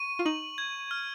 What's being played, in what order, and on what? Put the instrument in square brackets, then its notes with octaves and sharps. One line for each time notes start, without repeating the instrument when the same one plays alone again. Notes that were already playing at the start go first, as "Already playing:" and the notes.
Already playing: [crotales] C#6 D#7
[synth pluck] F4
[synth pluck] D#4 [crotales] F#7
[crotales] G#6
F6